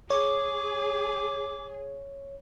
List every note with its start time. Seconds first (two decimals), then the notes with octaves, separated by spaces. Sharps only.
0.10 G#4 C#5 D6